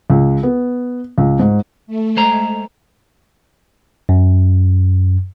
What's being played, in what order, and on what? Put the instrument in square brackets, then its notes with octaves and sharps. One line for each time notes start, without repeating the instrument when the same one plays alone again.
[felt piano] C#2
B3
C#2
G#2
[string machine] A3
[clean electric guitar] G#3 C5 A#5
[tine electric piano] F#2